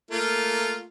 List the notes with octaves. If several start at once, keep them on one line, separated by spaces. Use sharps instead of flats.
A3 A#3 F4